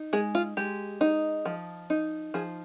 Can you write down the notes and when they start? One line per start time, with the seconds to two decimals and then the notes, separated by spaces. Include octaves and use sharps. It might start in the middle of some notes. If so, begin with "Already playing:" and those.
Already playing: D#4
0.13 G#3 G#4
0.35 F4
0.57 G#3 G4
1.01 D#4
1.45 F3
1.90 D#4
2.34 F3 G#4